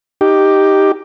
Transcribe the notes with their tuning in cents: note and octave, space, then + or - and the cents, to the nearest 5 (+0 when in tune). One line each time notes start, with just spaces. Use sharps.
D#4 +0 G4 +0